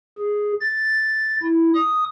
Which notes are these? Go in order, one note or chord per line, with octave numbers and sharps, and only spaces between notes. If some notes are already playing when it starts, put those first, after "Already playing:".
G#4
A6
E4
D#6